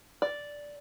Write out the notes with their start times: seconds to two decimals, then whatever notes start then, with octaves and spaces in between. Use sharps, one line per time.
0.22 D5